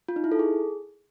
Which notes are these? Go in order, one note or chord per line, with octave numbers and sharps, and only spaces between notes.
F4
D#4
E4
A4
G#4